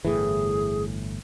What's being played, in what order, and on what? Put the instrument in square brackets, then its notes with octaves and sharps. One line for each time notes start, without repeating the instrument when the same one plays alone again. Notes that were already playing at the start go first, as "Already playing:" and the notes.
[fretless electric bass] G1 A2 E3 [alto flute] G#4